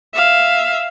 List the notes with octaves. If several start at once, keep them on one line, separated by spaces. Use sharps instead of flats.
E5 F5